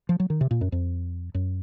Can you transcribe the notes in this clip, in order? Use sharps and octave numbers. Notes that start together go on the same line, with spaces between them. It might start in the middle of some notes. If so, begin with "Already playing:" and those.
F3
F#3
D#3
C3
A#2
F#2
F2
F#2